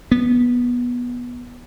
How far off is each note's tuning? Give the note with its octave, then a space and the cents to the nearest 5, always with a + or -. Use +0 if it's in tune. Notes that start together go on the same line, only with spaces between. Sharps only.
B3 -15